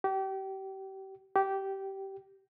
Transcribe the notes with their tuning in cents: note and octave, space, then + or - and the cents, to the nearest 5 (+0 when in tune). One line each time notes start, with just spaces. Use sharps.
G4 -30
G4 -15